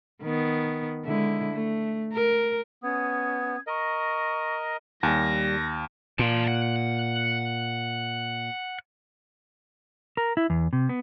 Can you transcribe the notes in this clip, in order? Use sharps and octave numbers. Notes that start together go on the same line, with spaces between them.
D#3 B3
D3 G#3 E4
A3
A#4
B3 C#4 D#6 G#6
A#4 D#5 C#6
D#2 G3 G#5 A5 A#6
A#2 A5 C6
F#5
A#4
E4
E2
C3
B3